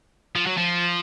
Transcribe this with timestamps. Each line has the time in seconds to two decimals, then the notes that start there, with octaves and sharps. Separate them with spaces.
0.36 F3
0.46 F#3
0.57 F3